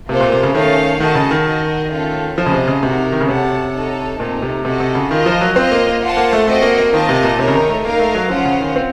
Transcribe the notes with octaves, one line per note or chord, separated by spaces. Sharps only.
C3 A#3 F4 A4 C5
A#2
C3
C#3
D#3 A3 C#4 A4 C#5 F5
D#3 F#4 A4 D#5 A5
C#3
D#3
F#4 A#4 D#5
A3 C#4 F4 A4
F3 F4 C5 D#5 A5
C#3
C3
C#3
C3 D#4 F#4 A#4
D#3
C#3
C3 F#4 A4 C#5 F#5 A5
D#4 A4 C#5 A5
A#2 A3 C4 D#4
C3
C3 F#4 A4 D#5 A5
C3
C#3
D#3 F4 A#4 D#5
F3
F#3
C4 F4 C5 D#5
A#3
A#3
F4 C5 F#5 A5
A#3
A3
A3 C4 F#4 C5 D#5
A#3
A#3
D#3 F4 A#4 D#5 A5
C3
A#2
C3 D#4 A#4 C#5
C#3
D#3
A3
A#3 D#4 A#4 F5
A3
F#3
F3 C#4 F4 C5 F#5
C#3
D#3
C4